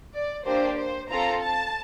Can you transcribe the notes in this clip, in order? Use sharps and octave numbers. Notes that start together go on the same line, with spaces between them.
D5
A#3 D4 G4 C5
C5
C4 F4 A4 A#5
A5